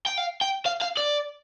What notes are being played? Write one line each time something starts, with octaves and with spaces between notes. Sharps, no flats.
G5
F5
G5
F5
F5
D5